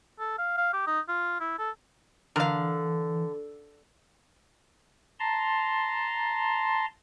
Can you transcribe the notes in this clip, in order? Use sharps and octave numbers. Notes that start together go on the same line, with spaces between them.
A4
F5
F5
G4
D#4
F4
E4
A4
D3 E3 A#4 F5
A5 A#5 C6